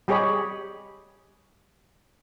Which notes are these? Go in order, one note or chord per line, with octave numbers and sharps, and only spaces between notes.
G3 G4 G#4 C#5 D#5 B5